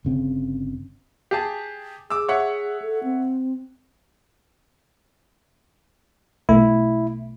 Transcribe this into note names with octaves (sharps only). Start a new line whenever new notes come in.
G1 C#3 C4
G4 G#4 A5
G#4 D6 E6
C#5 E5 F#5
A4
C4
B1 B2 A3 E4